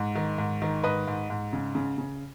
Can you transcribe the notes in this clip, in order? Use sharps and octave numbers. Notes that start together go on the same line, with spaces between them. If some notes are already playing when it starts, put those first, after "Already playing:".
Already playing: G#2
D#3
G#2
D#3
G#2 B4 D#5
G#2
G#2
C#3
C#3
C#3